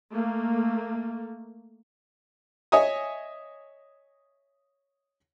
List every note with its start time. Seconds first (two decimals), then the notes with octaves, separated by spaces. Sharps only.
0.11 A3 A#3
2.72 C#5 D#5 E5 G#5 D#6